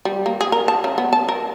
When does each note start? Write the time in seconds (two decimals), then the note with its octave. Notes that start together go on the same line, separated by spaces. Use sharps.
0.05 G3
0.26 A#3
0.41 G#4
0.52 A#4
0.68 A5
0.84 C#3
0.98 B3
1.13 A5
1.29 A#4